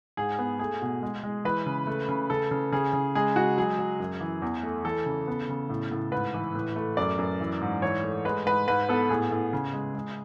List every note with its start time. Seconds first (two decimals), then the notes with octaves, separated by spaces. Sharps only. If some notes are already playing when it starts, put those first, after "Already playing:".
0.17 G#2 G#4
0.39 B3
0.59 A3 G#4
0.82 B2
1.03 G#3
1.23 G#3
1.45 E3 B4
1.66 C#3
1.87 A3
2.09 C#3
2.30 C#3 A4
2.51 C#3
2.72 C#3 G#4
2.93 C#3
3.15 G#3 G#4
3.36 G#3 F#4
3.58 F#3 G#4
3.79 F#3
3.99 F#2
4.21 E3
4.42 E2
4.63 A3
4.85 E3 A4
5.06 C#3
5.28 B3
5.49 C#3
5.69 A2
5.92 A2
6.12 G#2 B4
6.34 E3
6.55 A2
6.76 A3
6.97 F#2 D5
7.19 F#2
7.41 E3
7.61 G#2
7.82 E3 C#5
8.03 A3
8.25 G#3 B4
8.46 G#2 B4
8.68 G#2 B4
8.89 B3 A4
9.09 A2 G#4
9.31 A2
9.53 C#3
9.73 G#3
9.95 G#3